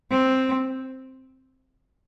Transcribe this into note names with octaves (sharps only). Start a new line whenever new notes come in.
C4